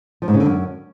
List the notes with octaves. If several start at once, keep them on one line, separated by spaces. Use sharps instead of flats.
F3
G#2
C#3
D3
F#2